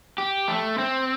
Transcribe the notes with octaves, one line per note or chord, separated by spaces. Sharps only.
G4
A3
C4